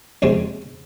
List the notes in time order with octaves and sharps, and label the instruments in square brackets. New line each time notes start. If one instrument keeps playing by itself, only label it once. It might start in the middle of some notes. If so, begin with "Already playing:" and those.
[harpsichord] A#1 F2 C3 G#3